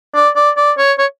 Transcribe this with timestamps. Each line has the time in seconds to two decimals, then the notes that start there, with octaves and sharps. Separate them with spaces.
0.15 D5
0.36 D5
0.57 D5
0.78 C#5
0.99 C#5